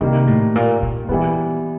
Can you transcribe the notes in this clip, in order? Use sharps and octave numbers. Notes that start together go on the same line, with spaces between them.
C3 D#3 G3 A#3
A2
A#2
A#2
A#2 E3 G3 B3